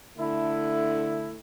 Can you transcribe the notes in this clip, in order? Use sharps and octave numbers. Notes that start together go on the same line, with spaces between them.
D3 A3 E4